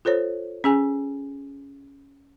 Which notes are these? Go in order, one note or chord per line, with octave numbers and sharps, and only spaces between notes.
F4 A4 C5 C#5
C#4 G#4 G#5